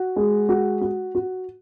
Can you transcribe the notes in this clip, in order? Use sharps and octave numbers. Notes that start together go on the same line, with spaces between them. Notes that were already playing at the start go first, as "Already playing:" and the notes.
Already playing: F#4
G#3
F#4
F#4
F#4